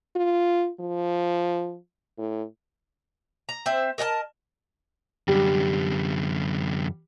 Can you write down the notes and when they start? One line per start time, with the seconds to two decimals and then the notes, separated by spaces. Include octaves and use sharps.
0.15 F4
0.80 F3
2.18 A2
3.49 A#5
3.66 C4 C5 E5
3.98 A#4 D#5 F#5 A5
5.28 F#2 D3 G3